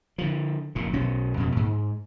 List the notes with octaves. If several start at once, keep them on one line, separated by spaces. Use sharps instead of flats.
D3 F3
F1 A#2
B1 B2 C#4
F2 B2
G#2